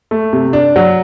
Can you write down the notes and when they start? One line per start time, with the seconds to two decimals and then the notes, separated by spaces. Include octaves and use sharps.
0.11 A3
0.33 C3
0.53 D4
0.76 F#3